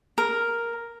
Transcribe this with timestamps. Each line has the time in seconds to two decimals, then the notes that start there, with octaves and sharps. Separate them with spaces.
0.18 A#4